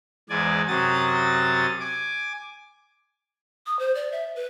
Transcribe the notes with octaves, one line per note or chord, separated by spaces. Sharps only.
E2 G#2 D5 G#5
F#2 C3 F#3 F#4 D#6 A6
G#5 D6
D#6
C5
D5
E5
B4